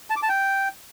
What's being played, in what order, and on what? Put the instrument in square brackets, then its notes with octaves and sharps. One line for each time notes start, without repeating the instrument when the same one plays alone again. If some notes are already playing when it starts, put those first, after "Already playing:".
[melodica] A5
D6
A5
G5